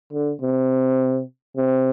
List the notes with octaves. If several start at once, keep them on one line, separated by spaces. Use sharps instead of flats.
D3
C3
C3